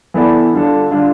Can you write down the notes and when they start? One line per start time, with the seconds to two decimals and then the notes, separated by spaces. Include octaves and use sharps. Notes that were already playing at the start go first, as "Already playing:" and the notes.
0.14 E3 B3 E4 A4 D5
0.53 D3 G3 D4 F4 A4
0.91 D3 G3 D4 F4 A4